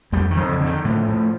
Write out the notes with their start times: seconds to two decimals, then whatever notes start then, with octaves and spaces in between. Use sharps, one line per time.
0.12 F2 G3
0.31 D#3
0.37 F2
0.49 D3
0.61 D3
0.66 D#3
0.84 A2 F3
1.08 A2